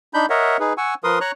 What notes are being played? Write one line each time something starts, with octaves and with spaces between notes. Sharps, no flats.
D4 D#4 B5 G6
A#4 C#5 D#5 E5 F#5
D#4 G#4 B4
F#5 G#5 C#6 E6
F3 A#4 B4 C6 D#6
C#5 A#5 C#6 F#6